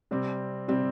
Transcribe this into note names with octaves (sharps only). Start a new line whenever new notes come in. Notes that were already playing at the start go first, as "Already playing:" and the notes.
C3 G3 C4
C3 G3 C4